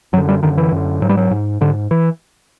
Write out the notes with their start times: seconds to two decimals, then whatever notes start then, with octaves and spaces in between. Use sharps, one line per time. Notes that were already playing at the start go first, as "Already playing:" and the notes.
0.13 F#2 F#3
0.17 D3
0.29 G3
0.43 F#2 D3 D#3
0.57 E3
0.72 F#2 D3
1.02 G#2 F#3
1.09 G3
1.17 F#3
1.31 G#2
1.61 G#2 D3
1.91 E3